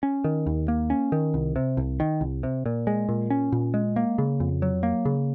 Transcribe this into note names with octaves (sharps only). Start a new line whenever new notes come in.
C#4
D#3
D#2
A#3
C#4
D#3
C2
C3
C2
D#3
C2
C3
A#2
G#3
A#2
C#4
A#2
G#3
A#3
C#3
F2
F#3
A#3
C#3